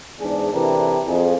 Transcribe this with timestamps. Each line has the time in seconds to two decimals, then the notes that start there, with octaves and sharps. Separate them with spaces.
0.20 E2 G#2 D4 G#4
0.53 C3 E3 D4 G4 A4 A#4
1.07 F2 G#4